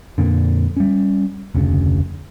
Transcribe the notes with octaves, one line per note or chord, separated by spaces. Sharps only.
F2 A#2 D3
G3 C#4
F1 D2 C#3